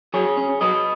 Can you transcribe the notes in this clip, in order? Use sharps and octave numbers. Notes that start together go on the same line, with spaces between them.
F#3 G#4 C#5
C#4
F#3 B4 D#5